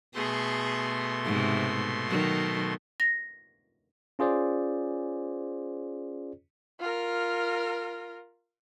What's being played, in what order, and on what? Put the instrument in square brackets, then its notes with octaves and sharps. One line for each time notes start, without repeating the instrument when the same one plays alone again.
[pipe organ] B2 A3 C6 [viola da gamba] G#4
[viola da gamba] G#2 C3
D#3 F#3
[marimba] A#6
[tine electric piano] C#4 F4 G#4 C5 D5
[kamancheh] F4 A#4